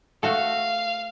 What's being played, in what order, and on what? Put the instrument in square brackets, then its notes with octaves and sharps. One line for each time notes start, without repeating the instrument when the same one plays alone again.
[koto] A3 F#4 A4 [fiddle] F5